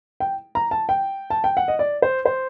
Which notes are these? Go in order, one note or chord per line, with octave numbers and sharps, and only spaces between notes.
G5
A#5
A5
G5
A5
G5
F#5
D#5
D5
C5
C5